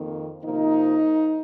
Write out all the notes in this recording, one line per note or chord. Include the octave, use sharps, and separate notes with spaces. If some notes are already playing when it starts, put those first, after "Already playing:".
Already playing: F2 D#3 A#3
C3 F3 A#3 D#4